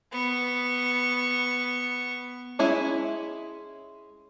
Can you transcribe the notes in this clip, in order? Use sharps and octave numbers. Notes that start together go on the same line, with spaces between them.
B3 C#6
G#3 C#4 E4